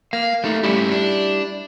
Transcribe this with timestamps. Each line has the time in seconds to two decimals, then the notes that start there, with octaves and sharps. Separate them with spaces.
0.13 A#3 F5
0.44 F#3 A3 A#3 D#4
0.63 G3 A3 C#4 E4 G4
0.91 D4